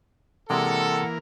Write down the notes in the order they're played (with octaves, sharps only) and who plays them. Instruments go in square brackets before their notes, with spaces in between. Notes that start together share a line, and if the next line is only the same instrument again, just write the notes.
[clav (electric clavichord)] C3 G#3 D5 [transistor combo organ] E3 A#3 A#4 [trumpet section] A4 [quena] F#5